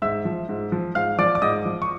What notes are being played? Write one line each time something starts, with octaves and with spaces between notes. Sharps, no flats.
G#2 E5 E6
F3
G#2
F3
G#2 F5 F6
F3 D5 D6
D6
G#2 D#5 D#6
F3
C#6